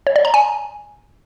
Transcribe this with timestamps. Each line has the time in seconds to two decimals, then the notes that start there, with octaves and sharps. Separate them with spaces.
0.07 C#5
0.16 D5
0.25 A#5
0.34 G#5